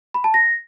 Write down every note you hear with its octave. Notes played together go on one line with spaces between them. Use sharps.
B5
A5
A#6